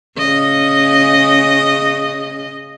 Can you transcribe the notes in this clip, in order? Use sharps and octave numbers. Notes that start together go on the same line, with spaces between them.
C#3 D#5